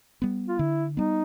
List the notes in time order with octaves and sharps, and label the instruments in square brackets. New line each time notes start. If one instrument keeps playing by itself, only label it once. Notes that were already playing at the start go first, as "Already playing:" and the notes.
[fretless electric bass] G3 B3
[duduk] F4
[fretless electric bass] D3 [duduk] E4
[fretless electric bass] G3 B3 [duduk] D#4